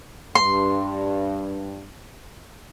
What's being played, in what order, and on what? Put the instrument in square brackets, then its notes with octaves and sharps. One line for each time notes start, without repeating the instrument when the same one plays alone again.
[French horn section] G2 [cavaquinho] C6